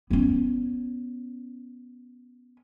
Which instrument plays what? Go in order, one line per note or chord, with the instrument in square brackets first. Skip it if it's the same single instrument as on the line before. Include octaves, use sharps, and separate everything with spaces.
[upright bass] B3 C#4